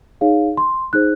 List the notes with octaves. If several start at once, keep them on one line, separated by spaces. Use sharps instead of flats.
D#4 G#4 C#5 F5
C6
D#4 G#4 C5 F#6